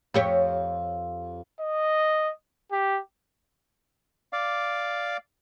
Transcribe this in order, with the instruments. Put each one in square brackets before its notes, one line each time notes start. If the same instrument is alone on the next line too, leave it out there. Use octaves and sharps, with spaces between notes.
[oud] F2 G4 C#5
[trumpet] D#5
G4
[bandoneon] D5 F5 D6